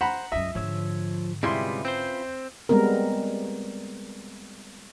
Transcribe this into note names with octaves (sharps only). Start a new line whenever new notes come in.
C5 F#5 A#5 B5
C#2 F#2 D#5 E5
G#2 D3 F3 C#5 E6
C3 G3 G#3 C#4 E4 F4 B4 C6
C4 C5
G3 G#3 B3 C4 A#4